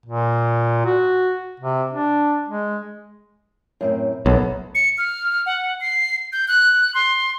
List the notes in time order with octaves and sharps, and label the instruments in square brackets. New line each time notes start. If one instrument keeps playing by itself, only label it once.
[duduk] A#2
F#4
C3
D4
G#3
[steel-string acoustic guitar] F#2 A2 C4
[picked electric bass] B1 [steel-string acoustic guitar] F#2 B3
[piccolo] C#7
F6
F#5
C7
G6
F#6
C6